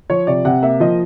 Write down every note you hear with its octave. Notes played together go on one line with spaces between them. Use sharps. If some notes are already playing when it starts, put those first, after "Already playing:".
F3 C#5
C3 D5
C3 F#5
A#3 E5
F3 D#5